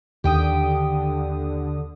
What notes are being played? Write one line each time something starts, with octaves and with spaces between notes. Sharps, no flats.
D#2 D3 G4 G5 D#6